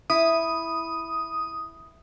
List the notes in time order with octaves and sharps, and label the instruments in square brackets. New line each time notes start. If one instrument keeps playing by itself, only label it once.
[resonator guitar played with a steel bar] E4 [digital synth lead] D#6